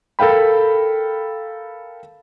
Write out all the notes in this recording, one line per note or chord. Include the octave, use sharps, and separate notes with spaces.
A4 A#4 F5 G5 B5